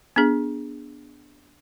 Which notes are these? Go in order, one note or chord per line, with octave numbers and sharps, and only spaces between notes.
B3 D4 G#4